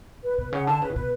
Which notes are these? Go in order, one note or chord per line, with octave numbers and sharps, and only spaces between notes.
B4
B2 B4
C#3 F#5
D3 A5
C#3 B4
A2
B2 B4